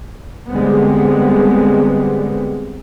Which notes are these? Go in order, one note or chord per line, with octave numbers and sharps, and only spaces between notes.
D3 G3 G#3 B3 C4